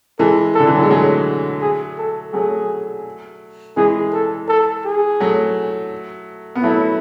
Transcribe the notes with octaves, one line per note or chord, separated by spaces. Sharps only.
E3 G#3 A4
A4
D3
E3
F#3
G#3
F#3 A3 G#4
G#4
A4
F#3 A3 G#4
E3 G#3 G#4
A4
A4
G#4
F#3 A3
B3
F#3 A3 E4